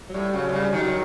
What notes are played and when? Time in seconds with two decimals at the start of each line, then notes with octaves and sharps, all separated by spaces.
0.09 F#3
0.14 A2 G3
0.33 C#3 F#3
0.49 C3
0.53 C#3 G3
0.73 D#3 F#3